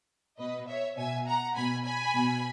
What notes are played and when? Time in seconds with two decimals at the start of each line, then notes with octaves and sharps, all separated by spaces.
0.38 B2 B4 D#5
0.68 C#5 E5
0.97 B2 E5 G#5
1.26 F#5 A#5
1.55 B2 G#5 B5
1.84 G#5 B5
2.14 B2